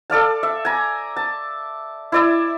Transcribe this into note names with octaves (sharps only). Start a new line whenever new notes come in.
A4 D5 F5 A5
E5
G#5 A#5
A5
E4 D5 E5